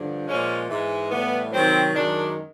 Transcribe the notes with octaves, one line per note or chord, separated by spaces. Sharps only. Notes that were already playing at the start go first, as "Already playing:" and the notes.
Already playing: G2 D3 F3
A#2 F3 G#3 C#4
G#2 E3 G#3
A2 E3 G3 B3
C3 D#3 F#3 C4
F#2 D#3 G#3 D4